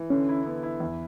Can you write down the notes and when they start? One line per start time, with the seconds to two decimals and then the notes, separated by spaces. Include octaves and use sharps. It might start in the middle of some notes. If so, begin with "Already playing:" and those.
Already playing: E3
0.10 D3 C#4
0.29 E4
0.46 B3
0.63 E4
0.80 E2